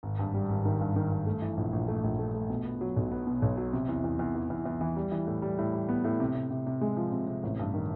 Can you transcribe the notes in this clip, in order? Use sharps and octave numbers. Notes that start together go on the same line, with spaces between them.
G#1
G2
G3
G#1
D#3
G2
D#3
G2
A3
E3
A#1
A#1
A3
A#1
A3
A3
B2
B3
F#3
B1
B3
B2
B1
F#3
C3
E2
E2
E2
E3
E2
E2
E3
G3
E3
A2
G3
A2
G3
B3
A2
C3
C3
C3
C3
G#3
F3
C3
C3
A1
G2
D#3